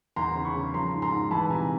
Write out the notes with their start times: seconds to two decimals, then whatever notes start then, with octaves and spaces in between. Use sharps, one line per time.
0.16 E2 A#5 C6
0.36 C#3
0.45 B5 C#6
0.55 C#3
0.74 F3 A#5 C6
0.93 G#2
1.02 A#5 C6
1.12 G#2
1.31 E3 A5 B5
1.50 C3 G#5 A#5